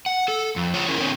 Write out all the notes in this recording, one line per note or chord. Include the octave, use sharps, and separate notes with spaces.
F#5
A4
F2
F4 C#5
C#4 E4 A#4 C#5
D3 C4 C#5